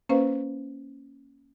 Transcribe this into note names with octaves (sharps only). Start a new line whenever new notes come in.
A#3 C#4 B4 C5 F5